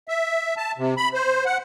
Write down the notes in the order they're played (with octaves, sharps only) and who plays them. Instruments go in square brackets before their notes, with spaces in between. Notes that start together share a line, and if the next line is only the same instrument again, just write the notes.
[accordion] E5
A5
C3
B5
C5
F#5